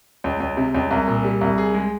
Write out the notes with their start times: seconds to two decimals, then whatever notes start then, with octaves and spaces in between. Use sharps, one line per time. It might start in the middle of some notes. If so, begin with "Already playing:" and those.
0.24 C#2
0.40 C#2
0.57 C3
0.74 C#2
0.91 C2
1.08 A#2
1.24 G3
1.41 C2
1.58 G#4
1.74 G#3